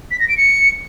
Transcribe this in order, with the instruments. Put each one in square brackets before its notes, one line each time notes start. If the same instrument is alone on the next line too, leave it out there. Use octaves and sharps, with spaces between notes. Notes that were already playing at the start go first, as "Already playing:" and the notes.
[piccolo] B6
A#6
D7
C#7